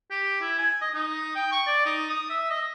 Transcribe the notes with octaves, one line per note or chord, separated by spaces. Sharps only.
G4
E4
G#5
D#5
D#4
G5
C#6
D5
D#4
D#6
E5
D#5